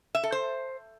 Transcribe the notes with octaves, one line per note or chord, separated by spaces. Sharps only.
E5
A4
C5